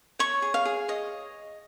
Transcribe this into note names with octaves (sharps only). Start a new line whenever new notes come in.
C#5 C#6
G#4
F5
G#4
C#5 D#5